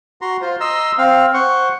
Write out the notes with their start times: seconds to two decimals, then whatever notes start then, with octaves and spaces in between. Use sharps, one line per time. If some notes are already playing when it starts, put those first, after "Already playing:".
0.21 F#4 A#5 C6
0.41 F4 C5
0.60 D#5 A#5 C6 E6
0.98 C4 F5
1.34 C5 F#5 C#6